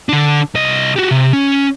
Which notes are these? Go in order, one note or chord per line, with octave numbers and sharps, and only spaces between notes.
D3 D4
C2 D#5
F#4 G4
C3
C#4